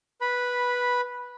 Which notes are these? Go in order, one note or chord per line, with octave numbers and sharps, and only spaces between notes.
B4 B5